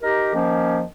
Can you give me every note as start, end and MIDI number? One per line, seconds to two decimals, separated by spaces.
0.02 0.31 63
0.02 0.31 67
0.02 0.31 70
0.34 0.82 51
0.34 0.82 53
0.34 0.82 58
0.34 0.82 61